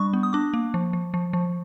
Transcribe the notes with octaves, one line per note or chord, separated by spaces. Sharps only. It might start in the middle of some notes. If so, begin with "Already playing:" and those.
Already playing: G3 D4 C#6
B3
D#6
D4 D6
A#3
F3
F3
F3
F3